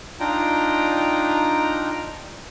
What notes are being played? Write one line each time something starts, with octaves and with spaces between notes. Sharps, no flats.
D4 D#4 F4 G5 A#5